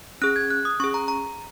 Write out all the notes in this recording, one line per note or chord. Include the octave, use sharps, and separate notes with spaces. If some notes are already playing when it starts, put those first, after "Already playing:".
C#4 G#4 F#6
G#6
F#6
D#6
C#4 G#4 C#6
A#5
A#5